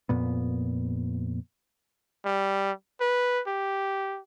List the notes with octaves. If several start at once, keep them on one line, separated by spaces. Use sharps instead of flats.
F2 A#2 B3
G3
B4
G4